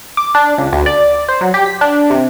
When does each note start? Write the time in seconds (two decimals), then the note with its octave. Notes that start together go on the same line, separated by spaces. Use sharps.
0.17 D6
0.35 D4
0.58 C#2
0.73 D2
0.86 D5
1.29 C5
1.41 F#3
1.54 G4
1.66 B6
1.81 D4
2.10 C3